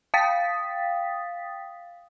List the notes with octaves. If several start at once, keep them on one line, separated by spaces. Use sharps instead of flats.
F5 G5 D#6 A6 B6